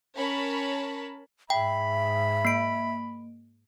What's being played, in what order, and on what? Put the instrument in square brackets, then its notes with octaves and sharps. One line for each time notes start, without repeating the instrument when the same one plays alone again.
[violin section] C#4 A#4 C#5 A5 B5
[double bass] G#2 [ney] E5 [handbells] G5 [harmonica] B5
[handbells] A#3 D7